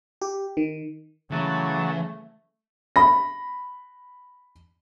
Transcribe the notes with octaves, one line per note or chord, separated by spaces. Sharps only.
G4
D#3
C#3 E3 F#3 A3 F#5 A5
B5 A#6